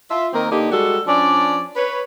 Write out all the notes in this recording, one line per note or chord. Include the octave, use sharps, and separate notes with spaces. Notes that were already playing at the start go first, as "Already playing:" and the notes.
F4 E5
D#3 A#3 C4 A#4
D3 A#3 D#4 G4
G3 G#3 F#4 A4
F3 C#4 D4 D5
B4 C#5